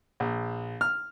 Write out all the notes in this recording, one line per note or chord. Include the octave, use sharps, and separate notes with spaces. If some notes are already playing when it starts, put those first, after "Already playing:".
A#1
F6